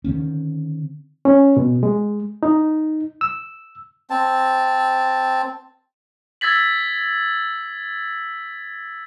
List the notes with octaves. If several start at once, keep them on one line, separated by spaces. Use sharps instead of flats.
D3 D#3 C4 C#4
C#4
B2
G#3
D#4
E6
C4 A5
E6 G#6 A6 B6 F#7